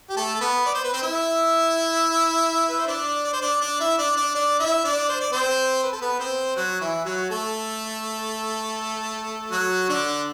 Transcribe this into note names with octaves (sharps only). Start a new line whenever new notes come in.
G4
A3 A4
A4
B3 B4
D5
C5
B4
C4 C5
E4 E5
B4
C5
D4 D5
D5
C5
D4 D5
D4 D5
E4 E5
D4 D5
D4 D5
D4 D5
E4 E5
D4 D5
C5
D5
C4 C5
B4
A4
B3 B4
C4 C5
F#3 F#4
E3 E4
F#3 F#4
A3 A4
F#3 F#4
D3 D4